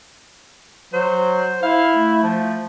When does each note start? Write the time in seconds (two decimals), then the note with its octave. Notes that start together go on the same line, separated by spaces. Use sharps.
0.93 F#3 C5
1.63 E4 F5
1.95 A3
2.23 F3